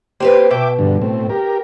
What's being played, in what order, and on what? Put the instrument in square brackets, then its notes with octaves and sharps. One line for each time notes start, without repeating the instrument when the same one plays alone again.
[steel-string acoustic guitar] A#3 C4 B4 [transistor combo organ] G4 C5
[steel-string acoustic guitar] B2 [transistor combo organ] E5 G5 D6
[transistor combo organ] G2 D3
A2 C4
G4 A#4